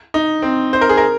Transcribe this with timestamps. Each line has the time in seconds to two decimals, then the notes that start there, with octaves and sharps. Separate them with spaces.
0.14 D#4
0.42 C4
0.73 C5
0.81 A#4
0.89 G#4
0.97 A#4